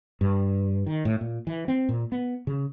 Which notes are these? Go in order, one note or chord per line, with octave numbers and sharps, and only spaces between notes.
G2
D#3
A2
A#2
E3
C4
A#2
B3
C#3